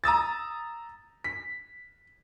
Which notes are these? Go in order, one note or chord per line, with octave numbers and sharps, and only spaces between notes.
A#5 D#6 E6 A6
B6